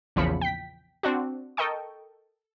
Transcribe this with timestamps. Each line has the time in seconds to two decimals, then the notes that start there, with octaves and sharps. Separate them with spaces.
0.16 A#1 E2 C#3 F3 B5 C#7
0.41 G5 B6
1.03 C4 D4 F#4
1.57 A4 A#4 D#5 G5 C#6